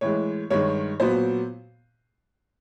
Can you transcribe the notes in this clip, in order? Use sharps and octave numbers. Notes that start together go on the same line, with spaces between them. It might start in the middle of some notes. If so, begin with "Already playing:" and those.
A2 E3 G#3 C#5
G2 D#3 G#3 C#5
A#2 F#3 B3 C5